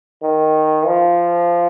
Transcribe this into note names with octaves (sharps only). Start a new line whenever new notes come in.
D#3
F3